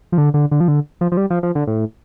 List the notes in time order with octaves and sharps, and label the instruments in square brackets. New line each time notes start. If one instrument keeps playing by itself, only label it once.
[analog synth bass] F3
D3
D3
D3
F3
D3
F3
F3
G3
F3
F3
D3
A2